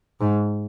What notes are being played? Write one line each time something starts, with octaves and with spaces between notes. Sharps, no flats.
G#2